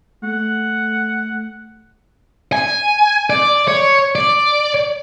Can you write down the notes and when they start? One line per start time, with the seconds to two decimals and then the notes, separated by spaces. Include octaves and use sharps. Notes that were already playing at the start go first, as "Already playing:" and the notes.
0.23 A3 F#5
2.52 G#5
3.30 D5
3.68 C#5
4.15 D5